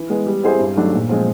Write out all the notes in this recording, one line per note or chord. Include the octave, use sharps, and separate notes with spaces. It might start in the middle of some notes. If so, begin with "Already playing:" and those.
Already playing: E3
G#3 B3
G3
C4 E4 G#4 C5
G2
D#3 F#3 A3 D4
A#2
F3 G#3 C4